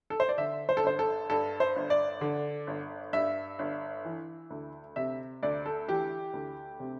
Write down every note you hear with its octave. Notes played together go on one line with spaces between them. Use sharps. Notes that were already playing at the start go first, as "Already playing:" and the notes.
A4
C5
D5
D3 E5
C5
A4
G1 C5
A4
G2 A4
C5
G1
D5
D3
G1
G2 E5
G1
E3
D2
C3 E5
D2 D5
A4
E3 G4
D2
C3